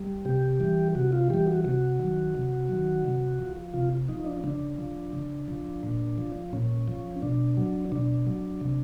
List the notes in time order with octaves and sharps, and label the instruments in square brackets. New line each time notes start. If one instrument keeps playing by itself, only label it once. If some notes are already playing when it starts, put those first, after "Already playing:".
Already playing: [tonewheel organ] G3
C3 G4
E3 G3
C3 F#4
F4
E3 G3 G4
F#4
C3 F#4
D#3 F#3
C3
D#3 F#3
C3
F3
C3 F4
F3 D#4
D4
C#3 D4
F3
C#3
F3
A#2
F3
A#2 C#4
F3
B2 D4
F#3
B2 D4
F#3
C3